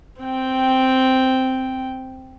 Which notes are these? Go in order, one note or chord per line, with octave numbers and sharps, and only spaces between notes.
C4 G5